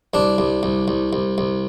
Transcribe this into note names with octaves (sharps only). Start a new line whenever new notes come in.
C2 D4
C2
C2
C2
C2
C2